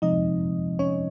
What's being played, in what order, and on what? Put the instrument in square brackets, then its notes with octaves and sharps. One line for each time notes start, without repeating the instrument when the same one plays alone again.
[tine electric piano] C3 F3 G#3 C4 [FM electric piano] D#4 D#5
[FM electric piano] C#4 C#5